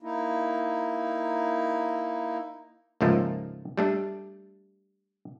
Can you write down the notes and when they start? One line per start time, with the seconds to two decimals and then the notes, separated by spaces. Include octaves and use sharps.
0.02 A#3 D#4 E4
3.01 C#2 G#2 F3 A3 A#3
3.77 G3 A3 D4